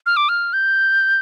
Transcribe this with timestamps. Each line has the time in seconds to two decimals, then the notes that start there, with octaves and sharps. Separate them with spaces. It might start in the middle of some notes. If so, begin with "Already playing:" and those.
0.06 F6
0.17 D6
0.29 F6
0.53 G6